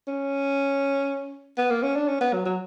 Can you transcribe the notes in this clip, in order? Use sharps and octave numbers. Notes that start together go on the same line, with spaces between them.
C#4
B3
A#3
C#4
D4
C#4
B3
F#3
F#3